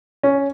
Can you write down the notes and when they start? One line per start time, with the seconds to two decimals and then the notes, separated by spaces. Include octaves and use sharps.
0.23 C#4